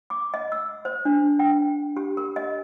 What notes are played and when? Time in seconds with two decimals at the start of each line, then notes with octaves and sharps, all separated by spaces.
0.10 D6
0.34 D#5
0.52 E6
0.85 C5
1.05 D4
1.39 G5
1.97 G4
2.17 A#4
2.36 D#5